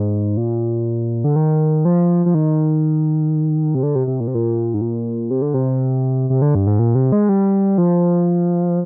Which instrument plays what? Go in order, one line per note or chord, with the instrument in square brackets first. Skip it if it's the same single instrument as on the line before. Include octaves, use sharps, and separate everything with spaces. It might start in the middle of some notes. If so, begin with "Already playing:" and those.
Already playing: [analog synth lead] G#2
A#2
D3
D#3
F3
F3
D#3
C3
D3
C3
C3
A#2
C3
A#2
G#2
A#2
C3
D3
C3
C3
D3
G2
G#2
A#2
C3
G#3
G3
F3